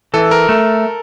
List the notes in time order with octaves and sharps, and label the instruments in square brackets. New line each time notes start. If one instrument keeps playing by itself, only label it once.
[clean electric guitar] E3 [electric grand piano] A4
[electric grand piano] A#4
[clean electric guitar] A3